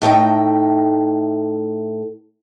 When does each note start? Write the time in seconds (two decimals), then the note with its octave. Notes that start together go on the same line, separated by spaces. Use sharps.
0.02 A2 A3 D#4 G5